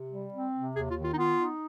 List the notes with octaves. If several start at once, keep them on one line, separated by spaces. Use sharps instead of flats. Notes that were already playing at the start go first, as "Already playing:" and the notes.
Already playing: C3
G3
C4
C3
D#2 G#4
F4
D#3
F4
D#4
B3 F4
D#4